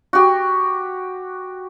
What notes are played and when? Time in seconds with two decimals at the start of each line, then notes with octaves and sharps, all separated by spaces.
0.13 F#4 G4